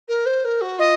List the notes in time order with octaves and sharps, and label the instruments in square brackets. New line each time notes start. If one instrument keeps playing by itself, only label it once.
[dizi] A#4
C5
A#4
F#4
[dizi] F4 [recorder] D#5